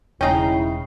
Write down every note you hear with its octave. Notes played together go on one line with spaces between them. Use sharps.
E1 C#3 G#3 A3 C#4 D#4 E4 G5